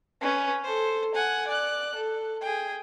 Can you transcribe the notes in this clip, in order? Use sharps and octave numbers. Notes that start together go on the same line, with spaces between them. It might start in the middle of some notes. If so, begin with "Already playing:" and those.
C#4 B4
A4 C5
F#5 G#5
D5 F#6
A4
G#4 G5